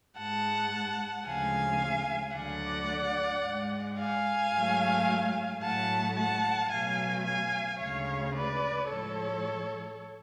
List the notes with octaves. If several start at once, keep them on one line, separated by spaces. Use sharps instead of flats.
G#2 G#3 F#5 A5
D2 C#3 F3 G#3 F5 G#5
D2 D3 F#3 D5 F#5
G#2 G#3
F5 G#5
G#2 F#3 A3
A2 F#3 A3 F#5 A5
F#5 A5
B2 F#3 A3 F5 G#5
F5 G#5
D2 C#3 G#3 C#5 F5
B4 D5
A2 F3 G#3 A4 C#5